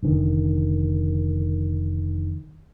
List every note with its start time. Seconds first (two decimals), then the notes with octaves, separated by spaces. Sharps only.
0.03 F1 D3 D#3